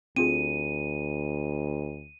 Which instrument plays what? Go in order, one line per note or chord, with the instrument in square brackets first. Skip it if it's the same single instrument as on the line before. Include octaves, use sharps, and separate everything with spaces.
[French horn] D2 [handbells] C4 F4 G#4 [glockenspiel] D#7